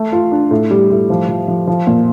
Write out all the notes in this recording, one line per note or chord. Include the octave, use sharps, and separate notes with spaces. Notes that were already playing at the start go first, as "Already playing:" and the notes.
Already playing: A3
F4
D4
A2
G3
A2
F3
F3
F3
F3
A#2